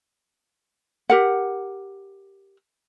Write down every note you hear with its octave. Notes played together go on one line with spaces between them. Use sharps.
G4 A#4 F#5